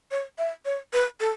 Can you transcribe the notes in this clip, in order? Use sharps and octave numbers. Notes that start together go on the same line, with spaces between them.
C#5
E5
C#5
B4
A4